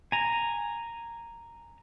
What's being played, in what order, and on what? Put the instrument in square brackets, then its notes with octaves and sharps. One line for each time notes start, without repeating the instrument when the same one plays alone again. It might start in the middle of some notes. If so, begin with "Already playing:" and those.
[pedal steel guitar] G#5 A#5